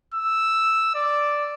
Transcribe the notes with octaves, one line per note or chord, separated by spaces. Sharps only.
E6
D5